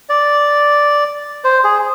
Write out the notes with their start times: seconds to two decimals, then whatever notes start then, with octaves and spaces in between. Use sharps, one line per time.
0.09 D5
1.44 C5
1.64 G#4